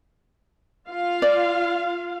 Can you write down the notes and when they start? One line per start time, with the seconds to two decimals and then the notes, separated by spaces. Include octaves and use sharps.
0.90 F4 F5
1.22 D5